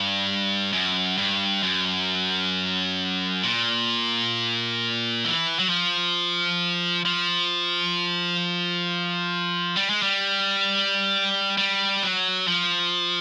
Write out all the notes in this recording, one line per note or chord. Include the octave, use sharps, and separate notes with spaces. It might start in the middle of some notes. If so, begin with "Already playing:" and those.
Already playing: G2
F#2
G2
F#2
A#2
E3
F#3
F3
F3
G3
G#3
G3
G3
F#3
F3